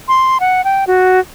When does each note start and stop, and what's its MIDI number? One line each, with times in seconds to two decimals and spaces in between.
0.08 0.38 84
0.40 0.64 78
0.64 0.84 79
0.87 1.20 66